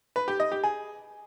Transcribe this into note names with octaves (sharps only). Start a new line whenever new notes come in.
B4
G4
D#5
G4
G#4